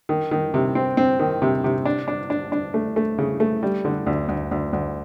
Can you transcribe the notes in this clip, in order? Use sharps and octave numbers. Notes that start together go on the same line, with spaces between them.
D#3
D#3
C3
C4
C4
D#3
C3
C3
D4
D4
D4
D4
A3
A3
C#3
A3
G3
D3
D2
D2
D2
D2